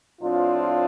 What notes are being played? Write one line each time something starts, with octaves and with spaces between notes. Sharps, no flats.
A2 F3 C4 D4 F4